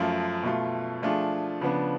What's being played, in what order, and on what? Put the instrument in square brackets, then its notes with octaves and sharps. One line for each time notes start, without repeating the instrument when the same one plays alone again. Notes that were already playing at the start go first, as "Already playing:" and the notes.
Already playing: [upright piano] F#2 F3 A3 F4
B2 A3 F4
F3 A3 D4 F4 G#4
C#3 F3 B3 D4